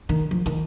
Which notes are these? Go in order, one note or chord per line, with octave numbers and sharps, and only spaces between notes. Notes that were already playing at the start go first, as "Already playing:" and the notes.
D#3
F3
D#3